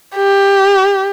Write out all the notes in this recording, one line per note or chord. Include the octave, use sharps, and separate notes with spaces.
G4